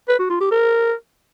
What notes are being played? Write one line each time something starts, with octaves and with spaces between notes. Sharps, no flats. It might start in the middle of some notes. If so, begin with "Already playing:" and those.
B4
F#4
F4
G4
A#4